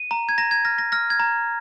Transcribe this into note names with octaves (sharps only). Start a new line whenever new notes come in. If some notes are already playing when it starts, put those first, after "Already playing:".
Already playing: D#7
A#5
G#6
A#5 A#6
G#6
F6 A#6
A#6
F6 A#6
G#6
A#5